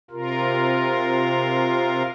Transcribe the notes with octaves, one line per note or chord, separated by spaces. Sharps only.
C3 F4 A#4